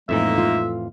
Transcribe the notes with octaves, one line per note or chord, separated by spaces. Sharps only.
F2 A2 E3 G#3 A#3 D#4 E5
F4